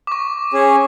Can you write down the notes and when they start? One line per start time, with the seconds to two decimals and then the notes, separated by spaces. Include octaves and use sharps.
0.07 C#6 D6
0.53 C#4 G#4